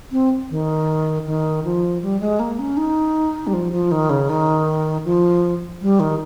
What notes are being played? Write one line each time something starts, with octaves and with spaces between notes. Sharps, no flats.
C4
D#3
D#3
F3
G3
G#3
A#3
C#4
D#4
G3
F3
F3
D#3
C#3
D#3
F3
G3
D#3